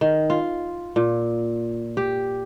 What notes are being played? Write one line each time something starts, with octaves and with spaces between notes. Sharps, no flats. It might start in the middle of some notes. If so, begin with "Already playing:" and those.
D#3
F4
A#2
G4